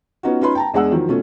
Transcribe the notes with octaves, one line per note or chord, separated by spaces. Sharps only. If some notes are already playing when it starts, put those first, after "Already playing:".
B3 C#4 D#4 F4 F#4
C#4 D#4 F4 B4 B5 C6
G5 A5 A#5
E2 G#3 D4 G#4 F#5 E6
D#3 F3 F#3
B2 A3 C#4 F4